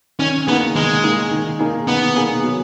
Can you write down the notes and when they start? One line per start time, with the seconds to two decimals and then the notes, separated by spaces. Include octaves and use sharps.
0.19 D#3 C#4
0.47 A#3 B3 D#4 G#4
0.75 D#3 G#3
1.03 A#3 D#4 G#4
1.31 D#3
1.59 A#3 D#4 G#4
1.87 D#3 B3
2.16 A#3 D#4 G#4
2.44 F#3